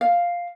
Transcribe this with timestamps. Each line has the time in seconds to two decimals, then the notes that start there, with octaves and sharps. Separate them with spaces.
0.01 F5